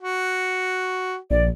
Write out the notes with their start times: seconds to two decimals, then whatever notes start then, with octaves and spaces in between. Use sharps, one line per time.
0.01 F#4
1.31 A#1 D5